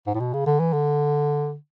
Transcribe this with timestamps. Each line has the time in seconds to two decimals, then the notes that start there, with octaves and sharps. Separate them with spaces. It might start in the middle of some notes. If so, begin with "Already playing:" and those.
0.07 G#2
0.14 A2
0.20 B2
0.33 C#3
0.46 D3
0.59 E3
0.73 D3